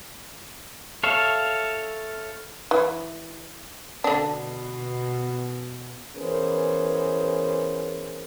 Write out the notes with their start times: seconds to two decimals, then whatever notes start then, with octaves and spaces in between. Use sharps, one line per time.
1.03 A4 C#5 E5 F5
2.71 E3
4.04 B2 D3 D4
6.16 E3 B3 C#4 G#4 A#4 C5